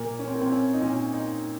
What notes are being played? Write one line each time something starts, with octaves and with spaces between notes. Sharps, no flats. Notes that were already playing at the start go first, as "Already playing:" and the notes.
Already playing: A#2 A#3
C#4
C4
A#3
C4
C#4
D#4
A#2 C#4
D#4